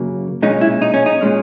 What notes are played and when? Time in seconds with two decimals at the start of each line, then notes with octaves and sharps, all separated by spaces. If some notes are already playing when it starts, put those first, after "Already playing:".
Already playing: F#2 C#3 F#3 A#3
0.42 B1 A#2 G#3 C#4 D#4
0.61 E4
0.82 D#4
0.94 C#4
1.06 D#4
1.21 A#2 G#3 C#4